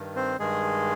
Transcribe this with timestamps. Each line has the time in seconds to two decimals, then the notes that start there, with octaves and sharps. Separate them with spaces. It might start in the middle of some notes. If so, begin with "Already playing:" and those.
Already playing: G2 D#3
0.16 C4 C5
0.39 G2 D#3 G#3 G#4